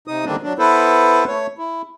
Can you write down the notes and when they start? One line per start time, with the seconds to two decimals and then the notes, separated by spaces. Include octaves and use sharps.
0.08 C3 D#4 D#6
0.25 D3 D#3 G3 A#3 C4 D4
0.43 F#3 D4
0.59 B3 E4 A4 B4 C5
1.28 A3 C#5
1.58 E4